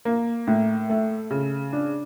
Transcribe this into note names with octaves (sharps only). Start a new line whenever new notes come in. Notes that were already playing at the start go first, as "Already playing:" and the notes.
A#3
A2
A3
C#3
D4